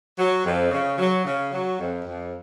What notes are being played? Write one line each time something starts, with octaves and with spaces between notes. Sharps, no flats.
F#3
F2
C#3
F#3
C#3
F#3
F2
F2